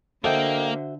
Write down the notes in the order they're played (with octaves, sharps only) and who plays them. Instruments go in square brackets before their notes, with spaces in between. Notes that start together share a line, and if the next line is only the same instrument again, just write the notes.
[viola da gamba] D3 [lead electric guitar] A#3 [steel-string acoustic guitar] F#4 C5 E5 [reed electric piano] A4 D#5 G5